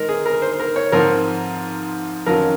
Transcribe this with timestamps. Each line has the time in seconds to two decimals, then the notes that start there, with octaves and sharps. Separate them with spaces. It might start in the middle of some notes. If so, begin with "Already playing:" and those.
Already playing: D#3 G#3 D#4 A#4
0.09 G#4
0.26 A#4
0.42 C5
0.60 A#4
0.76 C#5
0.92 G#2 F3 C4 A#4
2.26 F2 D#3 F#3 C#4 F4 A#4